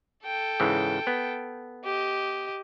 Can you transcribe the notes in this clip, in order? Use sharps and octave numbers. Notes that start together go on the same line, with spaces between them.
A4 G5
G#2 C#3 E3
B3
G4 D#5